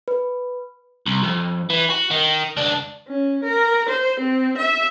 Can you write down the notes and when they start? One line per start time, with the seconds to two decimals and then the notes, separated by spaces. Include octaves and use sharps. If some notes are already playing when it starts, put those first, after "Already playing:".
0.08 B4
1.06 C2
1.24 F2
1.70 E3
1.90 F#4
2.11 D#3
2.57 C#2 D4
3.08 C#4
3.44 A#4
3.89 C5
4.20 C4
4.57 E5